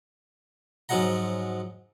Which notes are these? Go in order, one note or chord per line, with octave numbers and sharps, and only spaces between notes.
G#2 F3 F#3 G#3 F#5 A#5